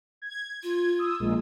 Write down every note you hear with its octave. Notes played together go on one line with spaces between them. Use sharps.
G#6
F4
D#6 E6
A#1 G#3 A#3